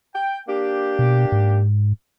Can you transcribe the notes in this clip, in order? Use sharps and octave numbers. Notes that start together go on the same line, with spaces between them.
G5
A#3 D4 G4
B2
G#2